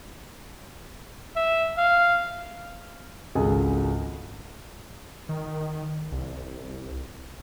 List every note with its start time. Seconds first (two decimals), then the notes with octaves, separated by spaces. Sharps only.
1.36 E5
1.78 F5
3.35 G#1 C#2 G#4 A4
5.29 D#3
6.12 C2